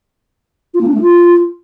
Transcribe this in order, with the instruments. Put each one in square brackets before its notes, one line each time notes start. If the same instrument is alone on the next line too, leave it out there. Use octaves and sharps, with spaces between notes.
[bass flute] F4
A#3
D4
A3
F4